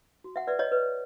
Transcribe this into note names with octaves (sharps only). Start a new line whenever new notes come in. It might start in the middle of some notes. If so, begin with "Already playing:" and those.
F#4
E5 F#5
B4 D5 E5
C#5 D#5
B4